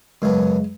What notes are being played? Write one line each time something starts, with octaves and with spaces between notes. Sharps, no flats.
F#2 C#3 F#3 G#3 B3